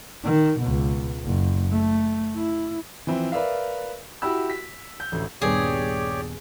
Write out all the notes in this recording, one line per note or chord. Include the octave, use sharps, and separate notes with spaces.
D#3
C#2 B2
F#1
A3
E4
E3 F3 C4 E4
A#4 B4 D5 E5 F5
E4 F#4 G4 B5 E6
B6
G6
A1 D2
D#1 G2 B3 G4 G#4 C#5 D5